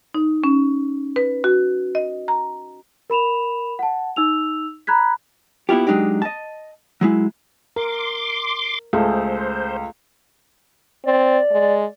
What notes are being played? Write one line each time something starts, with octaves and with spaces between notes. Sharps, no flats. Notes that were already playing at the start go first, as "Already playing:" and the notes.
D#4
C#4
B4
F#4
D#5
A#5
A#4 B5 E7 F7
F#5 A5
D#4 E6 F7
A#5 B5 F#6 G#6 B6
A#3 B3 E4 F4 G4
F#3 G#3 D4 D#4 G4
D#5 A5
F#3 G#3 E4
A#4 C6 D6
C#2 A3 G#4 A4 C5
C4 D5
G#3